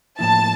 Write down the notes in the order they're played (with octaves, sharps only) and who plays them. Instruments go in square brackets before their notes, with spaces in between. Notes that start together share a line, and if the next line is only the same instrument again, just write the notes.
[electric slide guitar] A2 F3 A#3 E4 [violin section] A5